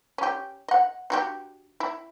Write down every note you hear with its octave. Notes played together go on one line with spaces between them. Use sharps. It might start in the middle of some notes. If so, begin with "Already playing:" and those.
C#4 G4
D#5 F#5
D4 F#4 G4
E4